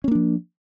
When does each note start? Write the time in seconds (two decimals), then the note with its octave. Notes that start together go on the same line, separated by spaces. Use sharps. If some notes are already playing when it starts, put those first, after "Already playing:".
0.04 C#4
0.08 A#3
0.11 D4
0.15 F3